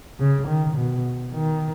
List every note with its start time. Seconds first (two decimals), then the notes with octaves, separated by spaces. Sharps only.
0.20 C#3
0.48 D#3
0.77 B2
1.33 D#3